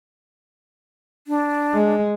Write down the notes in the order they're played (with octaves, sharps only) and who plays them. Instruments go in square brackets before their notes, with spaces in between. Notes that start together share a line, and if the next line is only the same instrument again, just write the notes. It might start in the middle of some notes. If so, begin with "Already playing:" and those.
[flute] D4
[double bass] G#3